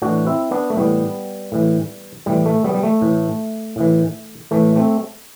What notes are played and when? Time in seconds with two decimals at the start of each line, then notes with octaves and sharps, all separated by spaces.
0.02 A2 E3 D4 F#4
0.26 C4 E4
0.51 B3 D4
0.70 A3
0.77 A2 E3 G3 B3
1.52 A2 E3
2.26 A2 E3 G3
2.46 A3
2.64 G3 B3
2.74 G3
2.83 A3
3.02 A2 E3
3.76 A2 E3
4.51 A2 E3 A3
4.76 A3 C4